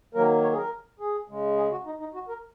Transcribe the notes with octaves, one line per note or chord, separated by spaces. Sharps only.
D#3 F#3 A#3 A#4
C#5
G#4
A#4
G#4
C#3 G#3
G#4
F#4
D#4
D#4
F#4
A#4